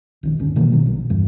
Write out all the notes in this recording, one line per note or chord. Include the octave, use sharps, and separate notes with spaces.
A#1 D#3
D1 G1 D3 C#4
B2 D#3 E3 A#3
G1 B2 D#3 F#3
A#1
E2 G2 E3